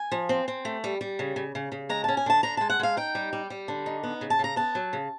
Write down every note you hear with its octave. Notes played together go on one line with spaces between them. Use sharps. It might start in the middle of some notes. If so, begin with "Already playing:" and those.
Already playing: G#5
F3
C4
C4
A3
G3
G3
C#3
C#3
C#3
C#3
G#3 A#5
C#4 A5
G#5
D3 A5
D3 A#5
G#3 A5
F#5
G#3 F5
D#4 G5
G3
G3
G3
D3
D#4
B3
C#3
A5
C#3 A#5
B3 A5
F#3
C#3